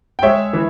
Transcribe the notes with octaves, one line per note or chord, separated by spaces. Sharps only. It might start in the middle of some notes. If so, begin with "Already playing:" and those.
G5
G#3 C#5 E5
E3